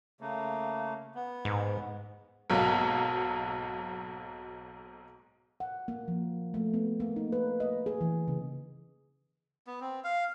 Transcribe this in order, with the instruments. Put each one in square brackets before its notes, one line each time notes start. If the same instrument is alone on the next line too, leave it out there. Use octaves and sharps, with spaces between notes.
[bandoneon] C#3 A3 A#3
B3
[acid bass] G#2
[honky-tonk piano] B1 G#2 F#3 A#3
[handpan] F#5
A#3
F3
A3
B3
A#3
D#4
B4
D#5
G#4
E3
C#3
[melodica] B3
C4
F5